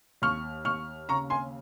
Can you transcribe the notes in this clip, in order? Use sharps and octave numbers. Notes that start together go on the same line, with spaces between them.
D#2 C#6 F6
D#2 C#6 F6
C#3 A#5 C#6
G#5 C6